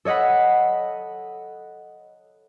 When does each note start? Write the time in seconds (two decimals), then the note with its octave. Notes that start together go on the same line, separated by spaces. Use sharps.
0.05 A4 C#5 D#5 F#5 B5